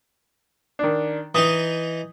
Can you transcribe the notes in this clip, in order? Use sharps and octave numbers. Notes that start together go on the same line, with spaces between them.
D#3 D4
E3 D#4 D#6